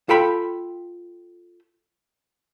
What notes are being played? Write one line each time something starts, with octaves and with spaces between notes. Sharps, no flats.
F4 A4 G5 B5